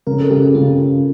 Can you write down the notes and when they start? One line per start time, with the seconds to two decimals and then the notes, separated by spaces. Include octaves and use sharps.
0.07 C#3 A#4
0.19 A4
0.30 C#3 G4
0.42 G4
0.55 C#3 F4